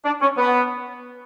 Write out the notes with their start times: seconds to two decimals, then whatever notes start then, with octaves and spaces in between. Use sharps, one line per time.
0.05 D4
0.22 C#4
0.38 B3